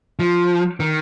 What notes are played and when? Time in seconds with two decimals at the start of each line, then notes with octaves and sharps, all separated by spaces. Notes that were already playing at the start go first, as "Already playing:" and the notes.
0.19 F3
0.80 D#3